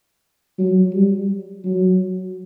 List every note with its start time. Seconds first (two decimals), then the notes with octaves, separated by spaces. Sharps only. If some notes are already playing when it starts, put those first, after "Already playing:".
0.59 F#3
0.93 G3
1.65 F#3